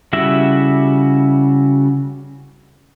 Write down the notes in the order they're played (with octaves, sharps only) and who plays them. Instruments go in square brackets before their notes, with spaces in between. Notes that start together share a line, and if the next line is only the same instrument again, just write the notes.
[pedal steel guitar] C#3 G3 E4 F#4 E5